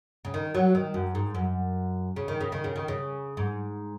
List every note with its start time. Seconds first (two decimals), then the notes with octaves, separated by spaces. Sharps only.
0.25 C#3
0.34 D#3
0.55 F#3
0.75 D#3
0.94 F#2
1.15 G#2
1.35 F#2
2.16 C#3
2.28 D#3
2.41 C#3
2.52 D#3
2.64 C#3
2.76 D#3
2.88 C#3
3.37 G#2